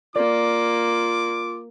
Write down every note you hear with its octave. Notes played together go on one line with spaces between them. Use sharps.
A#3 F4 D5 D6